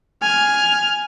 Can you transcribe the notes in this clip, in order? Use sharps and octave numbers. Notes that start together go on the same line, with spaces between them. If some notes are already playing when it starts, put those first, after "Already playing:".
G#5 F6